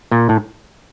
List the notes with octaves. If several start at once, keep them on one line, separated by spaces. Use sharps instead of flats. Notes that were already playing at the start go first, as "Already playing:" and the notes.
A#2
A2